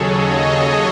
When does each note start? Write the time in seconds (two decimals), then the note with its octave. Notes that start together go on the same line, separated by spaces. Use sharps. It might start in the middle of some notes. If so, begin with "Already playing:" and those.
Already playing: D#2 C#3 F#3 G#4 A4 C#5
0.09 D#5
0.42 C#5